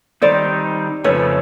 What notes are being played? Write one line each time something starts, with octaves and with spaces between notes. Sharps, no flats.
D#3 G3 C4 D#4 C5 D5
F2 C#3 F3 A3 C#4 B4 C#5